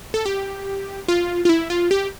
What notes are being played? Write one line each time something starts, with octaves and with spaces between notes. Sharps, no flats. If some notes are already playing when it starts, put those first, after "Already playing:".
A4
G4
F4
F4
E4
F4
G4